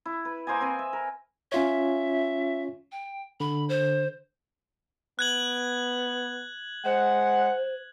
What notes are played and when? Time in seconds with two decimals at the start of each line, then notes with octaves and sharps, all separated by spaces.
0.06 E4
0.25 B4
0.47 A#3 C5 D#5 G#5
0.61 C4 B4 G#5
0.79 E5
0.93 A#4
1.52 C#4 F4 C#5 E5
2.92 G5
3.40 D3 B5
3.69 C5
5.19 B3 F#6 G#6 F#7
6.85 G#3 C5 F#5